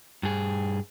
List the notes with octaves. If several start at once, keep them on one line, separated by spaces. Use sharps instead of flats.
G2 G#4